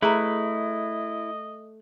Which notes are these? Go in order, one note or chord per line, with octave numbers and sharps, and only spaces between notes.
A3 E4 G#4 B4 D#5 A#5